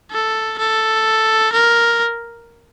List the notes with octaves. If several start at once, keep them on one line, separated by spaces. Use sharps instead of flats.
A4
A4
A#4